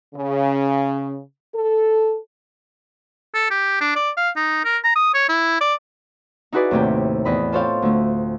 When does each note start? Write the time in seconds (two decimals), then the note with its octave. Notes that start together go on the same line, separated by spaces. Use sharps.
0.14 C#3
1.53 A4
3.35 A4
3.51 G4
3.81 D4
3.96 D5
4.17 F5
4.36 D#4
4.64 A#4
4.84 A#5
4.96 D#6
5.14 C#5
5.29 E4
5.61 D5
6.52 D#4 E4 F#4 G#4 B4 D5
6.71 D#2 A2 C3 G5
7.25 E2 D#5 B5
7.52 F4 A4 C5 C#5 F5 G5
7.82 D2 A3